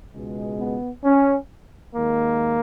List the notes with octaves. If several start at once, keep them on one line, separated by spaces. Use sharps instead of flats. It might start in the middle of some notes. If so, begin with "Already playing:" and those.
C#2 B2 G#3
B3
C#4
D#2 D#3 G#3 A#3